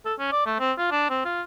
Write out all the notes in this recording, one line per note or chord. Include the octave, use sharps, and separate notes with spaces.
A4
C#4
D5
A3
C4
F4
D4
C4
F4